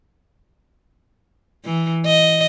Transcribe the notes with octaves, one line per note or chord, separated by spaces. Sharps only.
E3
D#5